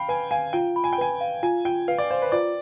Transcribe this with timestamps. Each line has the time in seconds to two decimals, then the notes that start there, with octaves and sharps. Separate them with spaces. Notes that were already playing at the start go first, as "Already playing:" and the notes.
Already playing: F5 G5 B5
0.08 B4 G#5
0.31 F5 G#5
0.53 F4 G5
0.76 B5
0.84 G#5
0.93 G5
0.98 B4 G#5
1.21 F5
1.43 F4 G#5
1.65 F4 G5
1.88 B4 F5
1.98 D5
2.10 C5 F5
2.22 B4
2.32 F4 D5